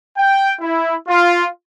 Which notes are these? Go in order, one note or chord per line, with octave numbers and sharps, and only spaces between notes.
G5
E4
F4